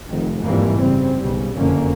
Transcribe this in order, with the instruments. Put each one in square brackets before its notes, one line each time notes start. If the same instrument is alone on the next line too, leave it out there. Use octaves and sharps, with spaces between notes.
[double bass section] F1 D#3
F2 G#2 C3 E3 G3 A#3
F#1 C#3 G3 C4
B1 C#3 G3
F#1 F2 D3 A#3 C#4